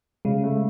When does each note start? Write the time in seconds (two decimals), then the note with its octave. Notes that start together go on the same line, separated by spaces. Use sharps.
0.25 C#3 G#3
0.44 A3